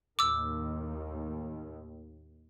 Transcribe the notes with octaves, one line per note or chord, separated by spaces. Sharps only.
D#2 A2 D#3 D6 E6